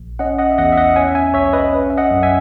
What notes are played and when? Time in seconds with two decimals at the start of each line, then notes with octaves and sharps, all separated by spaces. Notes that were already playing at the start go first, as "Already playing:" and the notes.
Already playing: A#1
0.19 C#4 D#5 F#5
0.39 D#5 F#5
0.51 E5
0.58 E2 D#5 F#5
0.72 E5
0.77 D#5 F#5
0.96 C#4 E5 G#5
1.15 E5 G#5
1.34 B1 C#5 E5
1.53 B4 D#5
1.73 C#4
1.90 E5
1.97 D#5 F#5
2.11 F#2
2.23 E5 G#5